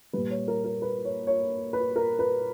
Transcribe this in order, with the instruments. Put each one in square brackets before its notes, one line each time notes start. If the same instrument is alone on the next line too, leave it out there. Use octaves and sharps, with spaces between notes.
[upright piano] A#2 G3 B4
C#5
A#4
A#4
B4
C#5
C#5
B4
A#4
B4